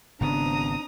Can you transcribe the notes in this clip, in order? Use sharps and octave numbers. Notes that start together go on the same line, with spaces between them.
G#1 C#3 B3 C4 D4 A#5 D#6